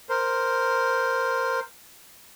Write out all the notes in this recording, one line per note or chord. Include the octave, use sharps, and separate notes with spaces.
A#4 C5